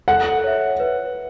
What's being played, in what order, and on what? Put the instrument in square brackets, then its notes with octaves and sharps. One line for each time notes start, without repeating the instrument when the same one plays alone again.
[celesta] A4 [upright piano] F#5
[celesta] C#5 E5
B4